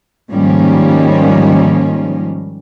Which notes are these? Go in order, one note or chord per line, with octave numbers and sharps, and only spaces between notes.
G#2 D#3 F3 G3 A#3 C#4